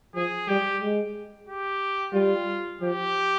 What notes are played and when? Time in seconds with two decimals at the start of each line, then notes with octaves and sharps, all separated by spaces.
0.15 F3 G#4
0.48 G3 G4
0.81 G#3
1.48 G4
2.14 G3 F4
2.81 F3 G4